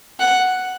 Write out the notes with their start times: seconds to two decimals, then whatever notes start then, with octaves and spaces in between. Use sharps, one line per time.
0.20 F#5